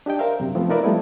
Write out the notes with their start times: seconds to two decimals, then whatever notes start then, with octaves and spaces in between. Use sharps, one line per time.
0.06 D4 G4 D#5 G5
0.19 A#4 C5 E5 F5
0.40 F#2 C3
0.55 F3 A3 B3 C4
0.70 D#4 F4 A#4 B4 D5 E5
0.84 F3 G3 A3 B3 E4